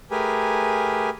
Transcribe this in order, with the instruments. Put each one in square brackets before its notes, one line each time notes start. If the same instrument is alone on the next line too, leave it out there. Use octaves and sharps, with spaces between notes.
[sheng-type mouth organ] A3 G4 G#4 A#4 B4 G#5